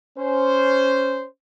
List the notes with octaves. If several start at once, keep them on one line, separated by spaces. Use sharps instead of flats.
C#4 C5